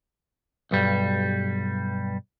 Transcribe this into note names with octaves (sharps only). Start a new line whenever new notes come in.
B1 G2 G3